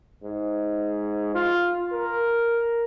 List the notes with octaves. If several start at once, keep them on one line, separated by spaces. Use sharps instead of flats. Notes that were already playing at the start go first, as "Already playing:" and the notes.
G#2
F4
A#4